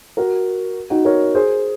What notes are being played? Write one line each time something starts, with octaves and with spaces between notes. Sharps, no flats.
F#4 A#4
D#4 F#4
A#4 C#5
G#4 C5